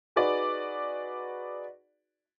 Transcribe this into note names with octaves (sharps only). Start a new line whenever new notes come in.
D#4 F#4 G#4 B4 D5